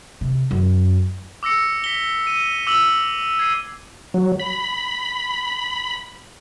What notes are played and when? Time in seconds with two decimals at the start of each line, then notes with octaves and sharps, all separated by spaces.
0.21 C3
0.51 F#2
1.43 D6 E6 A#6 C#7
1.84 B6 G7
2.27 D#7
2.67 D6 E6 D#7 F#7
3.39 G#6 C7 D#7
4.14 F#3
4.40 B5